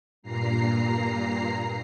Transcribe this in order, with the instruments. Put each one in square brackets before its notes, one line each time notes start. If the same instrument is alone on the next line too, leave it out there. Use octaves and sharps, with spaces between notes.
[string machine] G2 A#2 A#5 C7